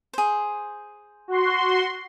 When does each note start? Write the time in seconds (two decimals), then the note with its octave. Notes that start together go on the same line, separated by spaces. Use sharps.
0.13 G#4 C5
1.28 F#4 C6